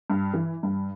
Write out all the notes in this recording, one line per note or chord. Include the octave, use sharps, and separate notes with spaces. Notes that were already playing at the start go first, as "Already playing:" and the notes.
G2
E3
G2